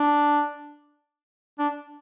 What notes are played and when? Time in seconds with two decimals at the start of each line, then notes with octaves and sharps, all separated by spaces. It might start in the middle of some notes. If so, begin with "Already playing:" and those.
Already playing: D4
1.59 D4